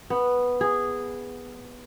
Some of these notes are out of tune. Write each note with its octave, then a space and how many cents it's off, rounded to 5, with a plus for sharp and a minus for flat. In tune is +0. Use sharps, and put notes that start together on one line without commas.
B3 -5
G#4 -10